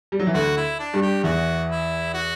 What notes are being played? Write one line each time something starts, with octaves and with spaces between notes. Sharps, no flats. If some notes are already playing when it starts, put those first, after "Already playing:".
G3
F#3
E3
D2 D3 F#4
E4
D4
G2 G3
G4
E2 E3 F#4
E4
F#4